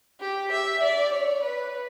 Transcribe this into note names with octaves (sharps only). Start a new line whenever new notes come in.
G4
E5
D5
C#5
B4